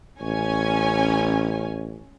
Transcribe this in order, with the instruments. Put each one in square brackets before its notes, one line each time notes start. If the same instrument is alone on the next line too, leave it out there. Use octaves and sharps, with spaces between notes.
[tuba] A1 [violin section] C#4 G#5